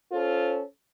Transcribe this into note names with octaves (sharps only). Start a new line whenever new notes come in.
C#4 F4 A4 C5